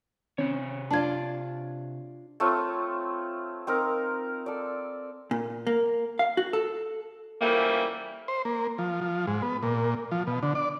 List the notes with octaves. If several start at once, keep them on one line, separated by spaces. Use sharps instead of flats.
C3 D#3 C4 C#4 C#5
D4 F4 D5 A5 G#6
A3 C4 F4 C#5
C4 D#4 A#4
A4 D5
A#2
A#3
F5
F#4
A4
C#3 E3 F3 G3 A3 A#3
C5
A#3
F3
F3
G#2
B3
A#2
F3
B2
D3
D5